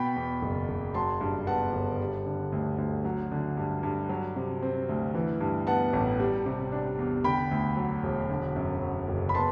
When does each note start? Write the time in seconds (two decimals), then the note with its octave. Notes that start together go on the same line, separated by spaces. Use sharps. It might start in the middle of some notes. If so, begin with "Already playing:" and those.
Already playing: B2 G5 B5
0.16 E2
0.42 F#1
0.69 F#1
0.94 F#3 A5 C6
1.21 G2
1.47 B3 F#5 A5
1.73 G1
1.99 G3
2.26 D3
2.52 D2
2.78 D2
3.05 F#3
3.31 D3
3.57 G2
3.83 G2
4.09 F#3
4.36 C3
4.62 C4
4.89 D2
5.14 E3
5.41 G2
5.67 B3 F#5 A5
5.93 A1
6.20 G3
6.46 C3
6.72 D4
6.99 E2
7.24 D3 G5 B5
7.51 D2
7.77 F#3
8.03 E1
8.30 D3
8.56 F#2
8.82 F#3
9.08 F#1
9.29 B5
9.34 B3 A5 C6